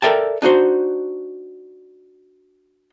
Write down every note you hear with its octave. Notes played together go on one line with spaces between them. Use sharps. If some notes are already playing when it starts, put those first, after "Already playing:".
A4 A#4 D5 E5 G5 A5
D4 D#4 F#4 C5